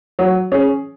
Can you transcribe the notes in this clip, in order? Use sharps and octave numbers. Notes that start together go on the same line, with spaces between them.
F#3
C#4 G#4